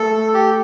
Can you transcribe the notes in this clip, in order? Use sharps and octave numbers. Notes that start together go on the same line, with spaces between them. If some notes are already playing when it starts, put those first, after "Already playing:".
Already playing: A3 A4
G4